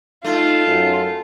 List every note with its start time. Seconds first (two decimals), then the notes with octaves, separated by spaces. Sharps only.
0.24 A3 D#4 F4
0.66 F#2